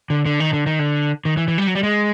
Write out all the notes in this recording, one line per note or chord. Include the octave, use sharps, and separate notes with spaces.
D3
D3
D#3
D3
D#3
D3
D#3
E3
E3
G3
F#3
G3
G#3